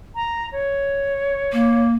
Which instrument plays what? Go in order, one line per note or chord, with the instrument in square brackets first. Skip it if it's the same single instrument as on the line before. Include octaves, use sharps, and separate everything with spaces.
[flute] A#5
C#5
[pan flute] A#3